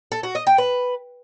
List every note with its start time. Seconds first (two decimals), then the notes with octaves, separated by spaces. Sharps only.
0.12 A4
0.23 F#4
0.35 D#5
0.47 G5
0.58 B4